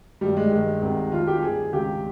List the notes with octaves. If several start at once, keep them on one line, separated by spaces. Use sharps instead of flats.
G2 D#3 G3
G#3
G2 D#3 G#3
C2 C3 D#3
F2 D#3 F4
G4
G2 D#3 G#4
C#2 C3 D#3 G4